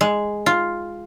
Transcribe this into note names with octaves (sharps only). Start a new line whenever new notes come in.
G#3
F4